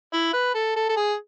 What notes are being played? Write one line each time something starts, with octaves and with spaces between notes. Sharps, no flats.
E4
B4
A4
A4
A4
G#4